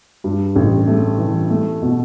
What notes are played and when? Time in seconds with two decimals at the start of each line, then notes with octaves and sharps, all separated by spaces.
0.24 G2
0.55 A1
0.87 A3
1.18 E3
1.50 A3
1.82 B2